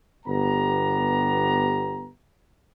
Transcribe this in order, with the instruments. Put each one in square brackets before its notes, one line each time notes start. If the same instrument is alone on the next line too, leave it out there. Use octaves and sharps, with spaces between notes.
[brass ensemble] G1 B3 G4 A#5